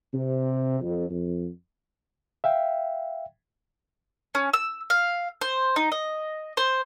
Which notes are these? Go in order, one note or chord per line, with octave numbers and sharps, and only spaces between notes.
C3
F2
F2
E5 F5 G5
C#4
E6
F5
C5
D#4
D#5
C5